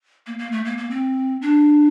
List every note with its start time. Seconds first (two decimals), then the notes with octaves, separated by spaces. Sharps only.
0.27 A#3
0.39 A#3
0.52 A3
0.65 A#3
0.78 A#3
0.91 C4
1.42 D4